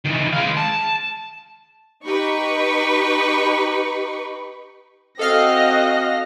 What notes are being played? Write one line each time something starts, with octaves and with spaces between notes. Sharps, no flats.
D#3 E3
G#3 F5
A5
D#4 G4 B4 B5 C#6
C4 F#4 A4 D#5 F5 F6 A#6